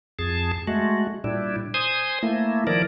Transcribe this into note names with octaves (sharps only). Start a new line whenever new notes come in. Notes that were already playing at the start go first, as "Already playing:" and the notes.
F2 G#4 A5
G#3 A3 F#4
A#2 G3 D4 E4
C5 G#5 D#6
A3 A#3 E4
D#3 F3 E4 A#4 D5